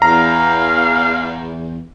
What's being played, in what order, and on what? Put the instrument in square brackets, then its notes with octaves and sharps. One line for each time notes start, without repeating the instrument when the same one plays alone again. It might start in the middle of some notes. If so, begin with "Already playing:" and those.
[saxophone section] E2 [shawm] F5 [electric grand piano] A#5